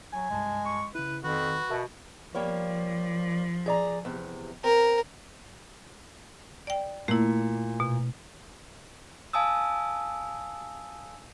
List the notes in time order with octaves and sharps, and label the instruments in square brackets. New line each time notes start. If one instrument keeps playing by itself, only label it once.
[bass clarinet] F#3 [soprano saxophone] G#5
[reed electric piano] C2 G2 A5 [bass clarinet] G#3
[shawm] C#6
[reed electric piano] C#3 E4 [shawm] B4
[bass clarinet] F2 [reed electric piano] D#3 [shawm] F#4 [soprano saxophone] B4
[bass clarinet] B2 [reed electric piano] A#4 E5 A5
[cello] F3 [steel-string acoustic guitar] G3 A#3 C#5
[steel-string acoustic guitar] G#4 D5 A#5
E2 C3
[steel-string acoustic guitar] C4 [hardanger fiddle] A#4
[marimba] D5 G5
[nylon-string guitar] A#2 [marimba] A3 E4
[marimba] B2
[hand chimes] F5 G#5 A5 D#6 E6